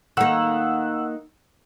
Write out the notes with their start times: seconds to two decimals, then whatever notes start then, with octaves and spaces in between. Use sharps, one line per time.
0.17 D#3 A#3 F#5 E6 F#6